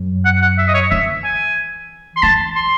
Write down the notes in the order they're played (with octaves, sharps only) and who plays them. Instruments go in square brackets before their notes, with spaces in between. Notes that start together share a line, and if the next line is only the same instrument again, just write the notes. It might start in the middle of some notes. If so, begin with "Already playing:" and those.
Already playing: [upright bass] F#2
[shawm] F#5
F#5
E5
D#5
C#5
[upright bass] E3 [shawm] E5
[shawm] G#5
C6
[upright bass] E3 [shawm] A5
[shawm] C6